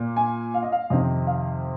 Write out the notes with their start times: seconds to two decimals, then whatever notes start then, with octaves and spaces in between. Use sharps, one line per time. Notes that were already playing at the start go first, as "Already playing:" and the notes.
Already playing: A#2 A#3
0.17 G#5
0.54 F5
0.63 D#5
0.72 F5
0.90 F2 C3 D#3 D#5
1.27 F5